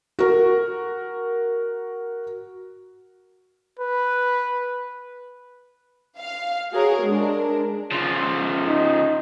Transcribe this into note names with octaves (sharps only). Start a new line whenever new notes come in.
F#4 A#4
B4
F5
F#4 G#4 A#4 C#5
G#3 D4 A#4
C#3 F3
D#4